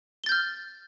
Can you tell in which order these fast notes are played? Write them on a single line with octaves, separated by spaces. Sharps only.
G7 A6 G6 F6